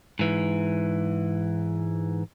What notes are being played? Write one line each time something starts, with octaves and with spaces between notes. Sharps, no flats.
G#2 E3